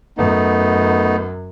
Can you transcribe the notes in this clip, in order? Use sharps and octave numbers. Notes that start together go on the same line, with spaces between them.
F#2 A3 B3 D#4